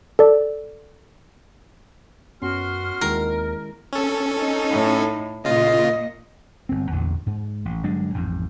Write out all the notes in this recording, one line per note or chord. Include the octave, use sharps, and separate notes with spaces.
A4 D5
F#2 B3 C#4 F#4 C6 F6
D#2 D#3 G#3 E4 A#4
C#4 A4
D#4
A2
A#2 C#3 F4 D#5
G1 C4
A1 E2 A#2 D3
G#2
A1
G1 F#3 G#3 D4
A1 F2 G#2